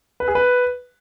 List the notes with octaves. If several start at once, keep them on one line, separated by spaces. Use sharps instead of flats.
B4
G#4
B4